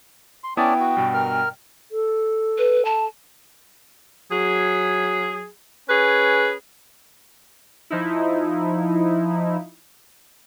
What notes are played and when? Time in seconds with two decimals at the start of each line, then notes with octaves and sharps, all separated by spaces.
0.44 C6
0.57 B3 C#4 E4 D5 G5 A5 D#6
0.80 F#4
0.97 G2 B2
1.14 A#4 F6
1.91 A4
2.58 B4
2.85 A5
4.30 F#3 G#4
5.89 C#4 G#4 B4
7.90 F3 D#4 E4